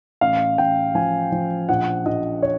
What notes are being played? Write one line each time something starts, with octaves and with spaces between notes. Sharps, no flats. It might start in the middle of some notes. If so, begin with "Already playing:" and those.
A1 F5
A1 G5
F3 G#5
F3
A#1 F#5
A#1 D#5
C#5